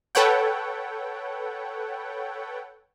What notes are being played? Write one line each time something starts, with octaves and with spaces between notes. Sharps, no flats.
A4 B4 C#5 F#5 G5